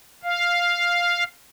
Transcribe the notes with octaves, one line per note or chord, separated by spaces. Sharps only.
F5